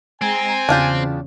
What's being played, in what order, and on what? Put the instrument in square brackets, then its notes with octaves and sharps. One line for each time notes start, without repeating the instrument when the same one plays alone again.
[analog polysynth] G#3 A#5 [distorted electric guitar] C4 [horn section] G#5
[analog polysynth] E2 C#3 [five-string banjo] D4 F4 G4